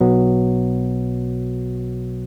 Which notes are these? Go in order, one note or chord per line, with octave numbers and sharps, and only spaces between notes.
B1 B2 F#3 B3